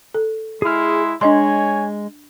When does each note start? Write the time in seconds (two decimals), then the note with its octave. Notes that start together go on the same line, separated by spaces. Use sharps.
0.14 A4
0.62 G#3 E4 G#4 C6 F6
1.21 G#3 D4 C#5 D#5 G#5 C6